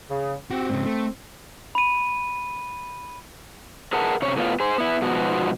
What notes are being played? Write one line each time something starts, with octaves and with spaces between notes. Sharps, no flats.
C#3
C4 F#4 G4
G#2 C#3
A3
B5 D#7
G#4 A#4 B4 F#5 A5
C3 C#4 C#5
A2 B3 F4
G#4 C5
B3 E4
G#2 B2 F3 B3 F#4